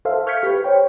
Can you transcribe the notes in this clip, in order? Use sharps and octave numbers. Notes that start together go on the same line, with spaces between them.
A4 C5 E5 F5
C#6 F6 G6 G#6 B6 C#7
G4 B4
C5 C#5 G5